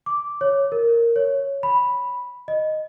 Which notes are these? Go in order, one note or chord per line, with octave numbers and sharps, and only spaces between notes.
D6
C#5
A#4
C#5
B5
D#5